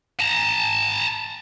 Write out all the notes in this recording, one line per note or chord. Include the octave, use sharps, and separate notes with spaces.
A5 A#5